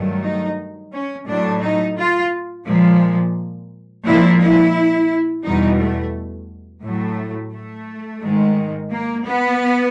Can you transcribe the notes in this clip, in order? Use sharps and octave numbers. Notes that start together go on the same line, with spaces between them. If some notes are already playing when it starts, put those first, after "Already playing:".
Already playing: G2 D#3 F#3 A3
D#4
C#4
A2 F#3 A3 D4
D#4
F4
A#2 F3 G#3
A#2 F3 G#3 E4
E4
E2 B2 G3 D#4
A3
A2 F#3 A3
A3
G#2 D#3 G#3
A#3
B3